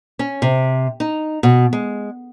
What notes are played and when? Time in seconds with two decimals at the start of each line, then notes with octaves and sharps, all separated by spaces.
0.19 C#4
0.42 C3
1.00 D#4
1.43 B2
1.73 G#3